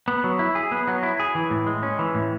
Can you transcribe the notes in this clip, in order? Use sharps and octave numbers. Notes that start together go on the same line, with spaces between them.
B3
F#3
E4
G#4
B3
F#3
E4
G#4
E3
A2
G#3
C#4
E3
A2